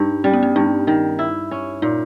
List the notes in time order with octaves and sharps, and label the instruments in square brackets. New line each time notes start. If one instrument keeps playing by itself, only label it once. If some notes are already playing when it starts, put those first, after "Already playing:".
Already playing: [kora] G2 [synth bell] D#4
[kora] G3 [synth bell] C#4
[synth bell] B3
C#4
[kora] G2 [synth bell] D#4
[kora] D#3 [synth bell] D#4
[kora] E4
C#4
[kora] A#2 [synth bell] D#4